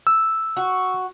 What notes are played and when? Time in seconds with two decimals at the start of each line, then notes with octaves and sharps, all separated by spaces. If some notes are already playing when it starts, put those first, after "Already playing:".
0.07 E6
0.57 F#4